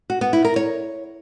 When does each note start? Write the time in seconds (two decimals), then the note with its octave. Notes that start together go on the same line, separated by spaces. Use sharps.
0.10 F#4
0.21 B3
0.33 E4
0.45 A#4
0.56 C#5